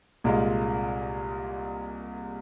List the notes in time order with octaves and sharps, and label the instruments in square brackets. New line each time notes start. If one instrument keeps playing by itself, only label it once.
[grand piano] C2 A#2 G#3 F4